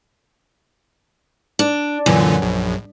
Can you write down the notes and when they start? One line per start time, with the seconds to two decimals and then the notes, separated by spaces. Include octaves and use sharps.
1.59 D4
2.06 F#2 A#2 D3 E3
2.42 A#1